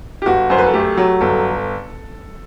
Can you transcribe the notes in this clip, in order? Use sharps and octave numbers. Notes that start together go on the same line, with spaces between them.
G4
G1 F#4
F#2 C5
B4
A4
A3 G4
F#3
G1 A4